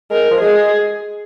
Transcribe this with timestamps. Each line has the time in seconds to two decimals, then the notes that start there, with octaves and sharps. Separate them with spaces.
0.11 G#3 A#4
0.31 F3
0.41 G#3 G#4